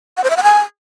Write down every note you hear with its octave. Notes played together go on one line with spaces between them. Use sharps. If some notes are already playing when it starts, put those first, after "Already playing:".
F#5
C5
E5
F#5
G#5